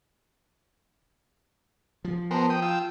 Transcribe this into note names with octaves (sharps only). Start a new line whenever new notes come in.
F3
B3 A#4 C5 G#5 A5
G5 D#6
F4 G5 E6